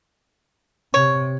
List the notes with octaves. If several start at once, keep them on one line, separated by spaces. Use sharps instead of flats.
C3 C#5